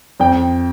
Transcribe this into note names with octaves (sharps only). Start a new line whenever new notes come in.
F2 G5